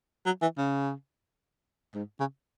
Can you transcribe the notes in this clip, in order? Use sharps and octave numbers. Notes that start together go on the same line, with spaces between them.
F#3
E3
C#3
G#2
C#3